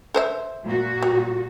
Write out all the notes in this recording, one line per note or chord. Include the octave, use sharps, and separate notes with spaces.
A4 C5 E5
A#2 F#4
G3